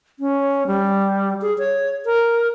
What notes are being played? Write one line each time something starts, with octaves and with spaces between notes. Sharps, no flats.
C#4
G3
G#4
C#5
A#4